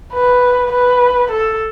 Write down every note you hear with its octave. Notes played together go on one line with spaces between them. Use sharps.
B4
B4
A4